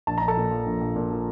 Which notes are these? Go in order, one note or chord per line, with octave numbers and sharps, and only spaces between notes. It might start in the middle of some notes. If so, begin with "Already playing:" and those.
A#1 A5
A#1 A#5
A4 A5
A#2
F3
A#1
A#1
A#2
F3